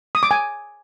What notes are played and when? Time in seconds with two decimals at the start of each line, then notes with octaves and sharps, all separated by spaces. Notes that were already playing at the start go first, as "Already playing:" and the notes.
0.15 D#6
0.23 D6
0.31 G#5